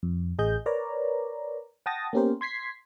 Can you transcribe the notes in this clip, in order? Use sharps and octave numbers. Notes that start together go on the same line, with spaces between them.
F2
A1 G#4 D#5 G6
A#4 B4 C#5 D5 A#5
F#5 G5 A5 D#6 A6 A#6
A#3 B3 C#4 G4 A#4 C5
C6 G#6 B6 C7